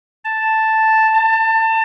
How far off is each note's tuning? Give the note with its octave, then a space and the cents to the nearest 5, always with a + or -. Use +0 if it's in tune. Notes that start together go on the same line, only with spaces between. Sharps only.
A5 +0
A5 +25